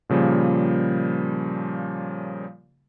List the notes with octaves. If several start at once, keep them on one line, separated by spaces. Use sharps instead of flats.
A#2 C#3 F3 G3 A#3